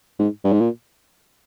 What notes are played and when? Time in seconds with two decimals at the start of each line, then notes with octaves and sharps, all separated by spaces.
0.19 G#2
0.44 G2
0.52 G#2
0.61 A#2